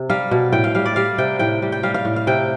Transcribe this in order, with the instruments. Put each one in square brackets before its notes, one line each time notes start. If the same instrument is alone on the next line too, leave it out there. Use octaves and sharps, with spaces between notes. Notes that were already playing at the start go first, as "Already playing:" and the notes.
Already playing: [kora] C3
G3 F5
B2
A2 G5
F5
G3 F5
D5
G3 F5
C3 G5
A2 G5
G3
G5
G3 F5
F5
A2
F5
C3 G5